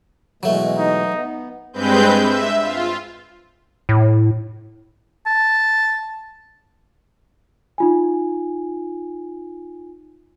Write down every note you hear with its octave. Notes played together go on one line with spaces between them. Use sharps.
B2 E3 F#3 G#3 A3
D#4
B3
G2 G#3 C4 B4 G6
E5
F4
A2
A5
D#4 F4 G#5